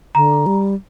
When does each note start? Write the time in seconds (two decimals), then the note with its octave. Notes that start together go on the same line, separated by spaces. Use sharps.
0.15 D3 A#5
0.46 G3